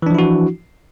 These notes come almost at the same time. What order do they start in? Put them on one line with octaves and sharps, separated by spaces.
E3 D4 F3 E4 F#4